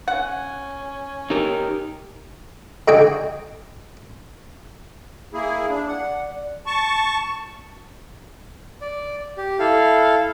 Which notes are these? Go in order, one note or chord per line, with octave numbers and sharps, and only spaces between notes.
C#4 F#5
D#4 G4 A#4
D3 D#4 F#4 G5 G#5
A#3 E4 G#4
D4
D5 F#5
A5 C#6
D5
G4
E4 A4 F5